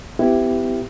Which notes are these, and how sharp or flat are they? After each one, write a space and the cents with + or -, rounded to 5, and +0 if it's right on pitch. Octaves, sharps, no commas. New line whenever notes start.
B3 +40 E4 +10 G4 +0